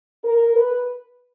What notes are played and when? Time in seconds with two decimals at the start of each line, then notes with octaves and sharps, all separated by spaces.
0.24 A#4
0.56 B4